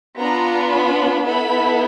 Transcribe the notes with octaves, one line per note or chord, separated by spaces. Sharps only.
B3 D4 F4 A#5
B5
B3 E4 A4 B5